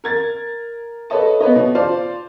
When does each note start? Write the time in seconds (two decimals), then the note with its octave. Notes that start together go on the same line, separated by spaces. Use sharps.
0.04 A#4 G#6 A6
1.10 A4 B4 C#5 D#5 A5
1.41 B3 B4 C#5 D#5
1.55 B2
1.75 F4 C5 D5 F5 A5